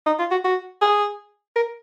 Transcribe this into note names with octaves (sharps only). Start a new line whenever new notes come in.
D#4
F4
F#4
F#4
G#4
A#4